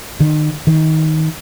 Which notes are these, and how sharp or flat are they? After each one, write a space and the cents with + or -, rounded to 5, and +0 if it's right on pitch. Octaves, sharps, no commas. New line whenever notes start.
D#3 -35
D#3 +15